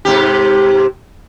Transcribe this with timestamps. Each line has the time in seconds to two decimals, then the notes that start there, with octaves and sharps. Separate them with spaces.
0.05 G#2 C3 G4